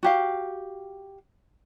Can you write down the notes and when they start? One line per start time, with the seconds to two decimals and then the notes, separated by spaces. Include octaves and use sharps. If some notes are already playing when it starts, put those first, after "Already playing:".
0.03 F#4 G4 F5